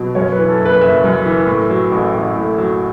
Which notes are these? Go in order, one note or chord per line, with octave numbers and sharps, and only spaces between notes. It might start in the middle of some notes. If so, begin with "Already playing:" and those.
Already playing: B2 F#3
F#2 C#5
B4
E3
A4
F#1
B4
F#1 E5
F#2
E3
A2
F#3
A1
A1
A2
F#3